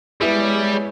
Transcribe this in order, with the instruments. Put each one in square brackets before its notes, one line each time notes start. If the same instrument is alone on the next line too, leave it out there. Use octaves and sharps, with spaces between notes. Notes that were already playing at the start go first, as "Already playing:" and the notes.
[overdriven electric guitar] G3 [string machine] G#3 C#5 [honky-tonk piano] B3 E4 G#4